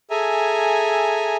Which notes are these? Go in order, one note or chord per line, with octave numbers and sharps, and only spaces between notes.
G#4 A4 E5 G#5 A#5